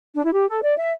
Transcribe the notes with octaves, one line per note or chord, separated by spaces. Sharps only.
D4
E4
G4
A4
D5
E5